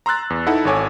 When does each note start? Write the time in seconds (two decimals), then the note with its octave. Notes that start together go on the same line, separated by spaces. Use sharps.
0.06 A#5 C6 E6 F#6 A6
0.30 E2
0.46 D#4 E4 A4 F#5
0.65 G#1 A4 C#5 G#5 D6